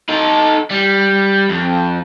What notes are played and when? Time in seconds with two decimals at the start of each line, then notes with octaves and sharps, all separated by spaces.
0.09 D#4 A4
0.70 G3
1.49 F2